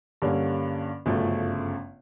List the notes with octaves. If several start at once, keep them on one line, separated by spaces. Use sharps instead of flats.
G2 D3 G3 A#3 C#4
G1 F#2 C#3 F3 A3